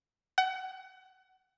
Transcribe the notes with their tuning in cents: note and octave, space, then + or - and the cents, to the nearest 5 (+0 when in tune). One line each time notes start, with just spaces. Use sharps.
F#5 +30